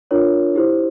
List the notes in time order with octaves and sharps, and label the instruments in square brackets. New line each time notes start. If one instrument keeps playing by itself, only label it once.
[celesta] D4 F4 A#4 C#5
E4 G4 C5